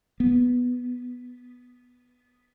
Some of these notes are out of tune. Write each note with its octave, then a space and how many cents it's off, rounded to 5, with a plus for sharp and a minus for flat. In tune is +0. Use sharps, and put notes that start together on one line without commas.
B3 +0